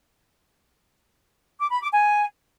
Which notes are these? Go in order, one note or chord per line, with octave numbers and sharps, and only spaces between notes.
D6
B5
D6
G#5